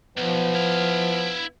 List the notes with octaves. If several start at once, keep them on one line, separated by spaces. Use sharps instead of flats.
B1 F3 B3
E4 F5